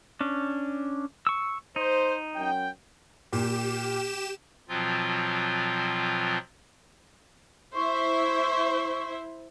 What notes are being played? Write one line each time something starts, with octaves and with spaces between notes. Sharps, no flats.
C#4 D4
C#6 E6
D#4 C5
F#2 G5
A#2 G4 E7
B2 F3 F#3 C4 F4
E4 C5 E5 C#6